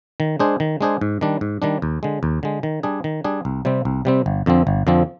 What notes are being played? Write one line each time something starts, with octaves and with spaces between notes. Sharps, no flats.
D#3
G#3 D4 G#4 C5
D#3
G#3 D4 G#4 C5
G#2
D#3 G3 D4
G#2
D#3 G3 D4
D#2
D3 G#3
D#2
D3 G#3
D#3
G3 D4 G#4
D#3
G3 D4 G#4
C2
C3 G3 C4
C2
C3 G3 C4
G1
F2 D3 F3 C4
G1
F2 D3 F3 C4